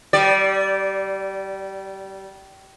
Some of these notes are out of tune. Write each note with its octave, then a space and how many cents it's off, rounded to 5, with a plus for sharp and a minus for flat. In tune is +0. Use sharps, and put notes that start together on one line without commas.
G3 -25 D5 +0